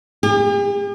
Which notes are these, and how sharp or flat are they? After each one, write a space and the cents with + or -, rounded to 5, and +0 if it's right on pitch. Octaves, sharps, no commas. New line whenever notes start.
G4 +45